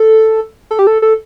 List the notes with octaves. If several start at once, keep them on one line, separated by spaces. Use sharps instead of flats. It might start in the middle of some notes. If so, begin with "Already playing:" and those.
Already playing: A4
A4
G4
A4
A4